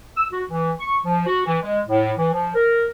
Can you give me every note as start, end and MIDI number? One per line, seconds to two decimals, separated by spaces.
0.16 0.26 88
0.32 0.44 66
0.50 0.71 52
0.79 0.99 85
1.06 1.26 53
1.27 1.42 66
1.46 1.58 52
1.62 1.81 56
1.87 2.13 45
2.18 2.31 52
2.33 2.53 53
2.55 2.87 70